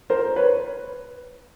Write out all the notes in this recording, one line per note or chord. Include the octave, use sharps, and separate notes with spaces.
A#4 C5
B4 C#5